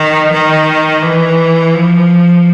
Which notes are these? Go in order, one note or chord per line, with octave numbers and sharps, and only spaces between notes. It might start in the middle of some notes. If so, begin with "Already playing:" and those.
Already playing: D#3
D#3
E3
F3